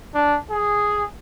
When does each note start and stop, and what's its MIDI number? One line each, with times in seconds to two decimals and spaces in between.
0.14 0.37 62
0.50 1.04 68